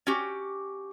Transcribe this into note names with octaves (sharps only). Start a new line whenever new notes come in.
C#4 F#4 G4